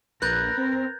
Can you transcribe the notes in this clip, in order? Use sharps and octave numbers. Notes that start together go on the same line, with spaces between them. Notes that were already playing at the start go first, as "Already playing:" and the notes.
A#1 A#4 B4 F#6 G6 A6
C4